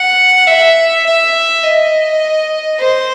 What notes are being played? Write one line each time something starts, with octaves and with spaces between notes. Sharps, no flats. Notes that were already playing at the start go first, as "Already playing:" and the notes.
Already playing: F#5
E5
E5
D#5
C5